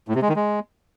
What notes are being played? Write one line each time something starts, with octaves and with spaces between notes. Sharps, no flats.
A2
C3
G#3
D#3
G#3